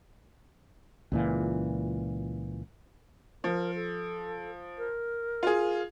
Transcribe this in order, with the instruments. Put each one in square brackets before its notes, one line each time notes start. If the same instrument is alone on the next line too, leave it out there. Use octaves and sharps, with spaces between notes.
[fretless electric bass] C#2 A#2 E3
[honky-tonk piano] F3 [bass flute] A#4
[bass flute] A4
A#4
[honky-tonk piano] F4 G#4